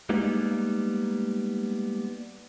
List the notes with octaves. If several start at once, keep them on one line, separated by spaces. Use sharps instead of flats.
G3 G#3 A#3 B3 D#4